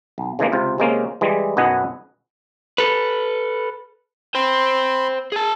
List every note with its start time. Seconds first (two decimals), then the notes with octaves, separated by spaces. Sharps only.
0.18 B1
0.39 C#3 E3 G#3 A#3
0.52 C#2 C3 F4
0.78 C3 G#3 A#3 C#4
1.21 E3 G3 G#3
1.57 B1 F#2 B3 D#5 F#5 G#5
2.78 A4 B4
4.35 C5 G5 B5 C6
5.32 G#4 A5